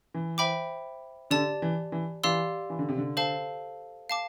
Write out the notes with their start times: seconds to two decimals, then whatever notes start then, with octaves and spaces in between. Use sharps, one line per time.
0.14 E3
0.38 C5 E5 G5 B5 D6
1.31 D3 G4 D5 A5
1.62 E3
1.92 E3
2.23 E3 G4 D5 F5 C6 E6
2.70 E3
2.79 D3
2.89 C3
2.98 D3
3.17 A4 C5 F5 A5
4.10 F5 A5 D6